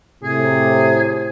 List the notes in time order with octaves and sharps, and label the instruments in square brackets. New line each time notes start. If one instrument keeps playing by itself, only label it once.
[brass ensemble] A2 C3 [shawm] G#4